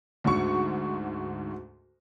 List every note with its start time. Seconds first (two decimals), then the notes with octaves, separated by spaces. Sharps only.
0.24 D2 G#2 F#4 C#6 C#7